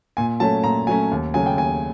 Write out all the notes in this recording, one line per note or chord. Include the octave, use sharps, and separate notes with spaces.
A#2 G#5
F#3 A3 C#4 A5
A#2 A#5
F#3 A3 C#4 G#5
D#2
C#3 F#3 A3 G#5
G5
D#2 G#5